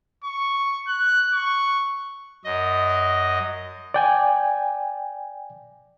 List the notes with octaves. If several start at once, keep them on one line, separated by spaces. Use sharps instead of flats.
C#6
F#6
C#6
F#2 D#5
D5 G5 G#5